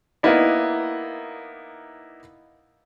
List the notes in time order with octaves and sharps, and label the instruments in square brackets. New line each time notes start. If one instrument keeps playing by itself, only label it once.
[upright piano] A#3 B3 D#4 E4 D5